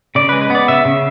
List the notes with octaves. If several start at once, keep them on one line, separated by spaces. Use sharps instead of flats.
C#3 D5
G#3 B4
B4
B3 D5
C#3 E5
C#3